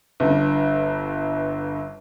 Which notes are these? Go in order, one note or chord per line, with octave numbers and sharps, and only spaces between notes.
G1 G2